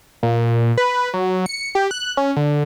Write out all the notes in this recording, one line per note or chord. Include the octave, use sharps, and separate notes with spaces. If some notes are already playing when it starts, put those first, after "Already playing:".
A#2
B4
F#3
C#7
G4
F#6
C#4
D3